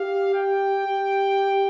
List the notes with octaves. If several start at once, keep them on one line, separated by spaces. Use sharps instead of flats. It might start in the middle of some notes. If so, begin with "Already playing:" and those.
Already playing: G4 F5
G5
G4